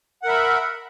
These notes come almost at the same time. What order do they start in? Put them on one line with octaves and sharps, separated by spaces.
F#5 A#4 E5 B5